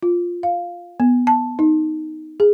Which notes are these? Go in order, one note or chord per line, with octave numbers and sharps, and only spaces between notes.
F4
F5
B3
A5
D#4
G#4